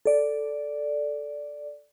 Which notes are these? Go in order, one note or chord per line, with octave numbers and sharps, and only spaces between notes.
A4 D5